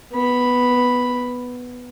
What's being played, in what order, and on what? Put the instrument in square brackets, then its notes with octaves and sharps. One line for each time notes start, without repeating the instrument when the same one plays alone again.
[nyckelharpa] B3 B5